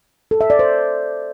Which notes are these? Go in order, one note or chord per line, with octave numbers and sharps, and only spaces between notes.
A4
E5
D5
C5